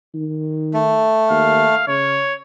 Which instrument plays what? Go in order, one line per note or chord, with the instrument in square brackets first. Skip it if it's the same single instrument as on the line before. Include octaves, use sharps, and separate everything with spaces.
[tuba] D#3
[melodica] A3
[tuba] D#2 [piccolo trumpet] F5
[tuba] C#3 [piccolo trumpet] C#5